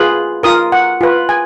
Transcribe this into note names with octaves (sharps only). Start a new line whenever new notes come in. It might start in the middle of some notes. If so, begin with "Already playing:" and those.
Already playing: F4 G#4 B4
F4 A#4 D#6
F#5
F4 B4
G#5